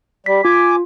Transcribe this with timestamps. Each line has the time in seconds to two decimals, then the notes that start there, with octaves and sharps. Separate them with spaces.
0.26 G3 B6
0.45 F4 G#5 D6